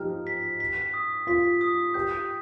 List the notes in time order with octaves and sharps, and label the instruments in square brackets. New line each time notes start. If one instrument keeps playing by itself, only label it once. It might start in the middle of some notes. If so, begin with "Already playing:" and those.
Already playing: [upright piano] F3 D#4 G4 [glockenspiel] F6
[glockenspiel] B6
B6
D#6
[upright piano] F4 [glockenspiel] B6
[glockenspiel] D#6
[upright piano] G4 [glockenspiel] G6